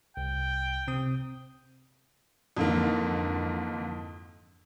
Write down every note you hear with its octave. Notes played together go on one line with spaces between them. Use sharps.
C2 G5
C3 C4 D#6
F2 G#2 D3 E3 A#3